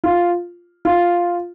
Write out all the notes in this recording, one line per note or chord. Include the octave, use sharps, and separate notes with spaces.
F4
F4